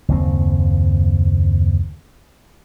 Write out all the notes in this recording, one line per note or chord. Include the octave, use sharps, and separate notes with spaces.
F#1 D#2 C4